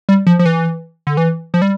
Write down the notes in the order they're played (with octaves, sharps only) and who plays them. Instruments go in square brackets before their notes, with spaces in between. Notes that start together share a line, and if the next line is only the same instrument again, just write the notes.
[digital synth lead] G3
F3
F3
E3
D3
E3
F3
G3